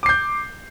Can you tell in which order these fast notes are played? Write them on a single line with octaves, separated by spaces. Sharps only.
D6 C7 G6